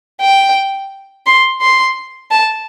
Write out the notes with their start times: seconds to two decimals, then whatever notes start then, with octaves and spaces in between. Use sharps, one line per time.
0.21 G5
1.26 C6
1.61 C6
2.31 A5